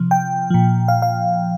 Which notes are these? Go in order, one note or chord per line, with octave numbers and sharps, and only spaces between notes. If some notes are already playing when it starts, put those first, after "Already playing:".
Already playing: C3 F3
G5
A#2 F3
F5
F5